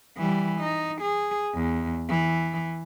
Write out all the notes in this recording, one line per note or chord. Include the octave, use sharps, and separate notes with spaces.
E3 G3
D#4
G#4
E2
E3